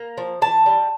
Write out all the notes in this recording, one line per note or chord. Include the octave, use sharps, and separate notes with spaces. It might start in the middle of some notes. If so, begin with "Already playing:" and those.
Already playing: A#3 A#5
F3
E3 A5
G3